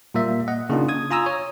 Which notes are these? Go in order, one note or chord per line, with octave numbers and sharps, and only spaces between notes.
A#2 G3 A#3 E5
D#5 F#5
C#3 A#3 D4 D#4 F4
D#6 G#6
F4 G#5 A#5 D#6 E6
C#5